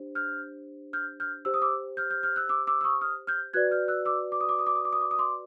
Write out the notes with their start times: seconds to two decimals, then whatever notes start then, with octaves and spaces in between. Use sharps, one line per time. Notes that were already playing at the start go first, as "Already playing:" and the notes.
Already playing: D4 G4 C5
0.15 F6 G6
0.93 F6 G6
1.20 F6 G6
1.45 G4 C5 E6
1.54 D#6
1.62 D6 E6
1.97 F6 G6
2.10 F6 G6
2.23 F6 G6
2.36 E6 F#6
2.49 D6 E6
2.67 D6 E6
2.81 E6
2.84 C#6 D#6
3.01 D#6 F6
3.27 F6 G6
3.53 F#4 B4 D5 F#6 G#6
3.71 F6 G6
3.88 E6 F#6
4.05 D6 E6
4.32 D6
4.41 D#6
4.49 D6
4.59 D#6
4.66 D6
4.75 D#6
4.85 D6
4.93 D#6
5.01 D6
5.11 D#6
5.19 C6 D6